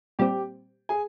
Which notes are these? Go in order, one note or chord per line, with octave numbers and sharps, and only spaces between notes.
A#2 G3 C4 G4 G5
G#4 G#5